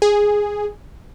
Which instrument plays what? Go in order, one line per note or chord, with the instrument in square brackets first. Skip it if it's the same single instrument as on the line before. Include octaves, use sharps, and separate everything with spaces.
[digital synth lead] G#4